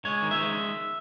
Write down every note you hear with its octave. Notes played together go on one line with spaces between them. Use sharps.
G#3 C#5
D#3
E5
G#3